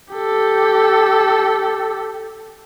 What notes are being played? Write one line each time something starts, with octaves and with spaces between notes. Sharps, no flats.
G4 A4